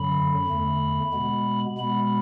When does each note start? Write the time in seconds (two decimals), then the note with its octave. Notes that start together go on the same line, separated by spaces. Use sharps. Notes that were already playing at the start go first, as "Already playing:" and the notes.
Already playing: F#2 D3 F#3 B5
0.46 E2 D3 A3
1.13 B2 G#3 B3
1.78 B2 G#3 B3 B5